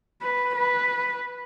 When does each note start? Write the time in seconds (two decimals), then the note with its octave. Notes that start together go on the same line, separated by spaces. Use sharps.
0.22 B4
0.56 B4